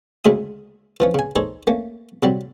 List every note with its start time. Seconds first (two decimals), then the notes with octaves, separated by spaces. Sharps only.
0.25 D2 C#3 G#3 E5 D#6
1.00 E3 F3 C#4
1.14 C#3 G#5
1.36 D#4 G#4 A4 C5 C#5
1.67 A3 A#3 C#4
2.23 C3 F#3 G3